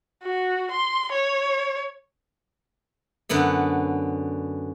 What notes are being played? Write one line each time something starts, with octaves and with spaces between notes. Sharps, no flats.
F#4
C6
C#5
F#2 D3 B3 E5